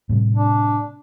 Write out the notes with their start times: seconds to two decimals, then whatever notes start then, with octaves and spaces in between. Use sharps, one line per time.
0.09 A2 C3 G3
0.36 D4